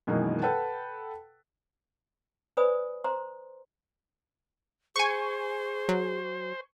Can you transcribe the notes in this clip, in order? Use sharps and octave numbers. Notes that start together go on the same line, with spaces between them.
F#2 B2 D#3 E3 G#3 A#3
A4 B4 F#5 G5 A5
B4 C5 D5 G#5 B5 D#6
C5 A#5 C6
G#4 C5 G#5 C#6
F#3